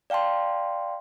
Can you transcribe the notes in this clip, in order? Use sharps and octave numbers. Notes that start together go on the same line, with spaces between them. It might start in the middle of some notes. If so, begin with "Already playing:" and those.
D5 F5 G5 A5 C6